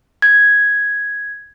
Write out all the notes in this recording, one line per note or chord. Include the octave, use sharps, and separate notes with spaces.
G#6